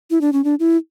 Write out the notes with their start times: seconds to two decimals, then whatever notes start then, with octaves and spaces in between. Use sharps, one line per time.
0.10 E4
0.21 D4
0.33 C#4
0.44 D4
0.60 E4